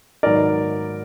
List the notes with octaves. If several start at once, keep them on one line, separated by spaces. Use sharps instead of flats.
G#2 D#3 F#3 B3 D#4 A#4 D5